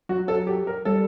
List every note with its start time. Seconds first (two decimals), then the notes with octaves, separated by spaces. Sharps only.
0.09 F#3 F#4
0.28 A4
0.47 G4
0.67 A#4
0.85 G3 A4